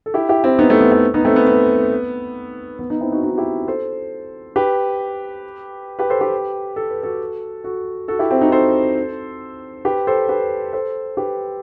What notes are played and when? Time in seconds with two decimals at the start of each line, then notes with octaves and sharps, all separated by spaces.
0.06 A4
0.14 E4 G4
0.29 E4 G4
0.44 C4 E4
0.58 B3 D#4
0.70 A3 C4
0.81 B3
0.92 A3
1.14 B3 D#4
1.25 A3 C4
1.36 B3
1.47 B3
2.79 B3
2.90 B3 D#4
3.01 C4 E4
3.12 D#4 F#4
3.23 D#4 F#4
3.38 E4 G4
3.68 A4 C5
4.56 G4 B4
5.99 G4 B4
6.10 A4 C5
6.21 G4 B4
6.76 A4
6.90 B4
7.03 F#4 A4
7.64 F#4 A4
8.08 F#4 A4
8.19 E4 G4
8.31 C4 E4
8.41 D#4 F#4
8.52 A4 C5
9.85 G4 B4
10.07 A4 C5
10.29 G4 B4
10.73 A4 C5
11.17 G4 B4